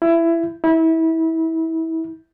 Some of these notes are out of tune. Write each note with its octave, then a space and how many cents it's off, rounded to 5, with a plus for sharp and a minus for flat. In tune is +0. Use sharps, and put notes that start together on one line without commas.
E4 +20
E4 -25